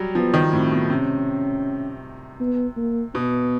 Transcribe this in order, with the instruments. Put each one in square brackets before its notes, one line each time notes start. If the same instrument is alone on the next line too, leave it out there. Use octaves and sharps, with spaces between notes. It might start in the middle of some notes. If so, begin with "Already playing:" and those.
Already playing: [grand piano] F#3 G3
[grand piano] F3 [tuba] B3
[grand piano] D#3
[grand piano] A2 [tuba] C4
[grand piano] B2
[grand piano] C3 [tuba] C#4
[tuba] B3
A#3
[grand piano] B2 [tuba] B3